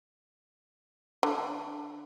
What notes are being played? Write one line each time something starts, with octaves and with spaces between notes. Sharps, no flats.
D3